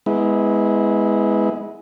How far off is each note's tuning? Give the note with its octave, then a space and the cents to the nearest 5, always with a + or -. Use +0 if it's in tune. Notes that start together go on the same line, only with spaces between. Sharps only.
G#3 +0 B3 +5 E4 -25